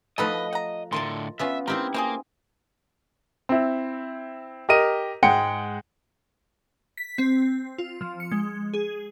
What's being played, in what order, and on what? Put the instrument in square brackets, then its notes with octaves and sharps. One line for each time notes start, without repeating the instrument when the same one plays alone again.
[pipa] B2 D#4 B4 [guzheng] F3 A3 A4 [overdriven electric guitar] D#5
[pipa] F#5 A#5
[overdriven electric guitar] A2 D3 [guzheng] A#4 D#5 A5 [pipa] C6
[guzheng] B3 C#4 F4 [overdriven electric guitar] E5
[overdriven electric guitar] C4 [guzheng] D#4 E4 G4 [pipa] A#4
[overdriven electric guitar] A#3 [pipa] C4 F4 G#4
[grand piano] C4 E4
G4 A#4 D#5 D#7
G#2 G#3 F#5 G5 C#7
[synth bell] B6
C4
F4
F3
C#7
G#3
G#4